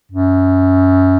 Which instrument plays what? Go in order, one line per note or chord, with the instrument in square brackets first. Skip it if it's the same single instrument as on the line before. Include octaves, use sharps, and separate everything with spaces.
[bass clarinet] F#2